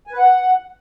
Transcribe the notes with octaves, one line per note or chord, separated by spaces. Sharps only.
G#5
B4
F#5